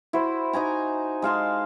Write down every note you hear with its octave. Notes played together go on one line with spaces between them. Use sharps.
E4 F#4 C5
D#4 F#4 G#5 A#5
G#3 F5 A5 C6